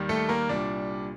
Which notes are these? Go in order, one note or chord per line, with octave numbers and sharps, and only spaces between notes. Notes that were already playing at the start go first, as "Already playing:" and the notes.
Already playing: D#2 D#3 G3
A3 A4
A#3 A#4
C2 A#2 G3 D4